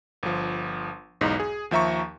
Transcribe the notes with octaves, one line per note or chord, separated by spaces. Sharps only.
G1 F3
B1 E2 G#2 D#4
G#4
D#2 F3 E5 A#5 C#6